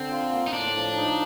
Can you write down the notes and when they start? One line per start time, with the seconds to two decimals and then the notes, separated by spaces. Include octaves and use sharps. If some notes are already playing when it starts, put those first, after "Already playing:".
Already playing: D3 C4
0.11 F4
0.32 A#3
0.47 D#4
0.53 A2 D4
0.75 F3
0.96 D#4